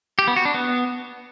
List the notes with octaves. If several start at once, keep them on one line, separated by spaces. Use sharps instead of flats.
G4
B3
F#4
D4
B3